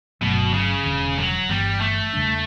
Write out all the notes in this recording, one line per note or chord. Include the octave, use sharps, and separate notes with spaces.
G1 G2 B2 F#3 A3
C#3
E1 E2 D3
F#3
G1 G2 E3 G3 B3
A3
E2 C#3 G3 D4